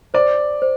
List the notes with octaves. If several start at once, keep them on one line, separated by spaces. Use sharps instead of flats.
C5 D5
C5